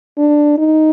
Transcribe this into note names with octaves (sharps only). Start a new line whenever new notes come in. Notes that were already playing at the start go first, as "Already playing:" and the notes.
D4
D#4